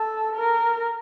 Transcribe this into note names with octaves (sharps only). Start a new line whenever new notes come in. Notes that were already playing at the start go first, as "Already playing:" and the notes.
Already playing: A4
A#4